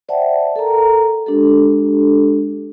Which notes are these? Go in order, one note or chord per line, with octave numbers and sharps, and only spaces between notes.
C5 D5 E5 F#5 G5 A5
A4 A#4 A#5
G#3 D4 G4 A4